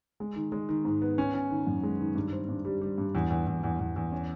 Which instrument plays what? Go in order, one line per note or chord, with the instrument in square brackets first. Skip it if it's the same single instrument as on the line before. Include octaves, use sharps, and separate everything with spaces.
[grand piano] G#3
D#3
G#3
D#3
G#2
B3
C#4
C#4
D#3
F#2
G#3
D#3
G2
C4
G2
G3
G3
G2
E2
E2
E2
E2
E2
E2
C#4